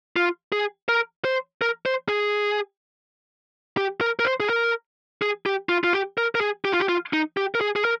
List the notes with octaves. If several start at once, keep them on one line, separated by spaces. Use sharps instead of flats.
F4
G#4
A#4
C5
A#4
C5
G#4
G4
A#4
A#4
C5
G#4
A#4
G#4
G4
F4
F4
G4
A#4
A#4
G#4
G4
F4
G4
F4
D#4
G4
A#4
G#4
G#4
A#4